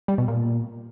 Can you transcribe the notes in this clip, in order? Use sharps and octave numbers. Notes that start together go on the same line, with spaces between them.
G3
B2
A#2